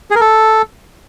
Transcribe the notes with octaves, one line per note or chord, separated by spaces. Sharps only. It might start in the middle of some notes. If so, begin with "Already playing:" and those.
G#4
A#4
A4